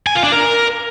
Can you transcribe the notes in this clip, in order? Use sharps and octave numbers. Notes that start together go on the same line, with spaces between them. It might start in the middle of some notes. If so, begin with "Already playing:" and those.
G#5
F4
D4
A#4